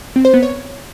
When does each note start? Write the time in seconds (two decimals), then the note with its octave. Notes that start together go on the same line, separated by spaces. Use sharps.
0.16 C4
0.25 C5
0.34 B3
0.43 C#5